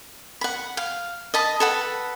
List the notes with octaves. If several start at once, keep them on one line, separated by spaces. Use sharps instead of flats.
F#5 B5
F5
D#5 A5 B5
A4 B4 F#5